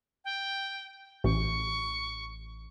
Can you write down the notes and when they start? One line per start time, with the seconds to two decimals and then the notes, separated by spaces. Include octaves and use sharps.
0.25 G5
1.24 A1 C#6